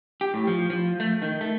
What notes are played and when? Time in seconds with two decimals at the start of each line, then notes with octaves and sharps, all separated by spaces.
0.21 G4
0.34 A2
0.47 F3
0.70 F3
1.00 A3
1.22 D#3
1.41 A3